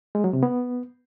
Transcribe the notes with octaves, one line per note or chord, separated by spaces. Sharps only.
G#3
F#3
C3
B3